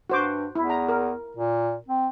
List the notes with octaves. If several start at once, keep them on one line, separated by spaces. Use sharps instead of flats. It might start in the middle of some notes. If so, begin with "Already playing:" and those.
G2 F#4 C5 D6
E2 E4
A#5
A#4
A#2
C4